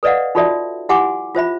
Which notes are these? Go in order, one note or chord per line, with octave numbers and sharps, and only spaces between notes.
A4 B4 D5 D#5 F5 F#5
D#4 F4 F#4 A4 D5 E5
E4 G4 F#5 G#5 C6 D6
F4 C5 E5 B5